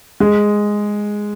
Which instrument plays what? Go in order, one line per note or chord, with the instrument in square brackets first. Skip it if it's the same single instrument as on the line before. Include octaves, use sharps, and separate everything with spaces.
[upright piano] G#3